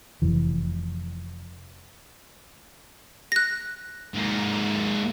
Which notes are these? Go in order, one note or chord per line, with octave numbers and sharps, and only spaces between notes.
F1 E3
F#6 A#6
G#2 A#3